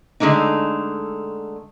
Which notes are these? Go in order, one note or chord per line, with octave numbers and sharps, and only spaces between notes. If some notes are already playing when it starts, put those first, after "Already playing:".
D3 G#3 A3 D4 D#4